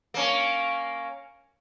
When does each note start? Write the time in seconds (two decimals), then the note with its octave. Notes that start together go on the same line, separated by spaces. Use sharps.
0.14 A#3 C#4